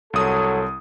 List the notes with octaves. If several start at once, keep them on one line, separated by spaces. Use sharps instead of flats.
C2 F#3 A4 D#6